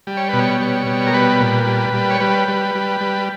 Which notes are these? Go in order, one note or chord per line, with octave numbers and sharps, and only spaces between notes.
G3
C#5
B2 B4
C#5
G3
B2
A#4
G3 B4
A#2
G3
G3
C#5
G3 B4
G3
G3
G3